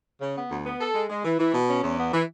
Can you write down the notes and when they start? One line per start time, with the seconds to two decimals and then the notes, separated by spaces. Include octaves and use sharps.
0.21 C#3
0.36 B3
0.51 D2
0.66 B3
0.80 A4
0.95 G#3
1.10 G#3
1.25 E3
1.39 E3
1.54 B2
1.69 C#4
1.83 E2
1.98 B3
2.13 E3